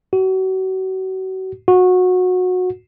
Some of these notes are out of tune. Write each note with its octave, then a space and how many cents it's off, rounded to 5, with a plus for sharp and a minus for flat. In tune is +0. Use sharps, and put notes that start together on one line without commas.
F#4 +35
F#4 -20